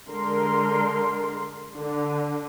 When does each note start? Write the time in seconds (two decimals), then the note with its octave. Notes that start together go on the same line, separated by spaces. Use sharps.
0.11 D3 G#3 A#4 C6
1.78 D3